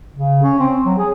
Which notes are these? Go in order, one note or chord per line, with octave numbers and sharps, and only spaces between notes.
C#3
C#4
C4
F#3
G#4